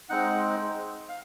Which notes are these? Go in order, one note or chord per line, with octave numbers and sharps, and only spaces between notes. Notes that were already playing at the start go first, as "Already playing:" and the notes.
G#3 C4 D#4 F#5
F5